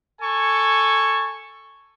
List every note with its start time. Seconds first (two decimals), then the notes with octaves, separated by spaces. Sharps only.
0.21 A4 G#5 C#6